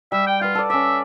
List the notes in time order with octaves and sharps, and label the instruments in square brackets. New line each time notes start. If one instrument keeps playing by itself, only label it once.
[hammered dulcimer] G3 [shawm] E5
[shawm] G5
[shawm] F4 [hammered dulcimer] B4 F#5
[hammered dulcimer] A4 D5
[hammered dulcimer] C#4 D5 [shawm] E5